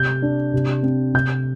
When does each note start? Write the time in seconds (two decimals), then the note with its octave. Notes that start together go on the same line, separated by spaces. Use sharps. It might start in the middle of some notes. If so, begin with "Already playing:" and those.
Already playing: C3 G6
0.22 D4
0.53 C3
0.83 C4
1.14 C3 G6